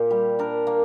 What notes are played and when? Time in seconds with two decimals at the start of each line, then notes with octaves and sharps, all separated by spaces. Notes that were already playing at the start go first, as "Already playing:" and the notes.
Already playing: A#2 G4
0.11 G3
0.39 D4 A#4
0.67 A#3